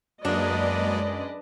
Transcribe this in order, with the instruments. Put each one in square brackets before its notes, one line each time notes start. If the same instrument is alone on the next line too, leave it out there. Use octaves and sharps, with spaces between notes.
[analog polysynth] F#2 G#3 [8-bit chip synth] F#3 A#3 [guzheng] D4 [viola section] B4 D5 D#5